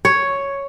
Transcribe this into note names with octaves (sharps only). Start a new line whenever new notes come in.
C#5